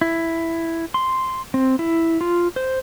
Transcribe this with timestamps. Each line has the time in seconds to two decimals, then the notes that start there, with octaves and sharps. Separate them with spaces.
0.01 E4
0.94 C6
1.54 C4
1.79 E4
2.21 F4
2.56 C5